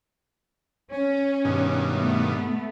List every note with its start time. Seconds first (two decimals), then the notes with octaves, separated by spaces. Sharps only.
0.93 C#4
1.45 G2 B2 D#3
1.91 A3 B3